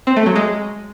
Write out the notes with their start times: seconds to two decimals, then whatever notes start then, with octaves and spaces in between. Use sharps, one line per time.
0.07 C4
0.16 A3
0.26 F#3
0.36 G#3